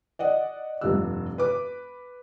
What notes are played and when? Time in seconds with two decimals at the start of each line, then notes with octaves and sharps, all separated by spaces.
0.19 D5 D#5 F#5
0.81 F1 G2 F3 G3 E6
1.38 B4 D6